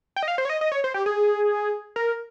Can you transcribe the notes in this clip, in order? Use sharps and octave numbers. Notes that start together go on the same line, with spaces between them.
G5
D#5
F5
C5
C#5
D#5
D#5
C#5
C5
G4
G#4
A#4